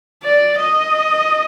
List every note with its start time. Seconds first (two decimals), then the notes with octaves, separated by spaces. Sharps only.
0.23 D5
0.60 D#5